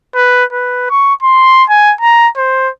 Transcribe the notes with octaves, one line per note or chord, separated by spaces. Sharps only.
B4
B4
C#6
C6
G#5
A#5
C5